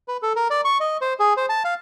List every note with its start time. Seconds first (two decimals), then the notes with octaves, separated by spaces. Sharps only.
0.08 B4
0.23 A4
0.36 A#4
0.50 D5
0.65 C#6
0.80 D#5
1.01 C5
1.19 G#4
1.37 C5
1.49 A5
1.64 F5